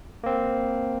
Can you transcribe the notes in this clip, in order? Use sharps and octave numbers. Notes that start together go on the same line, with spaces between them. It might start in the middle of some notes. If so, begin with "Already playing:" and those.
A#3 C4